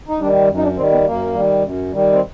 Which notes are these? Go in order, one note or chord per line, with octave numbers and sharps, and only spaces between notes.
D#4
D#3 G3 D4
F#2
D#4
D4
D#3 G3 C4
B3
F#2 A#3
D#3 G3
F#2
D#3 G3
C4